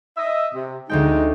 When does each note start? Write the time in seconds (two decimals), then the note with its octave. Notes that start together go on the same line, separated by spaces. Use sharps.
0.17 D#5 E5
0.54 C3
0.89 D2 G#3 C4 D#4 G5